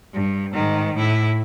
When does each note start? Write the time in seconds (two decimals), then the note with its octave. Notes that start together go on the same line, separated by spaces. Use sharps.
0.14 G2
0.53 G#2 D#3
0.95 A2 E4